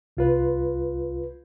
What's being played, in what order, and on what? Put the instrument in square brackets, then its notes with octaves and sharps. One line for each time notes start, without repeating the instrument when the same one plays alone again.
[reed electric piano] C2 F4 B4